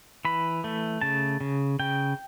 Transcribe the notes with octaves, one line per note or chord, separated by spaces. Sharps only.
E3 B5
A3
C#3 A5
C#3
C#3 G5